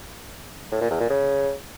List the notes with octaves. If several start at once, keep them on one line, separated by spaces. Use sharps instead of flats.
A2
A#2
E2
A#2
C#3